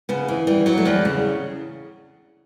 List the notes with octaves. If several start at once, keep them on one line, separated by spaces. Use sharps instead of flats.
C#3 B3
E3
E3 G3
E2 F#3
A3
E2 G3
C#3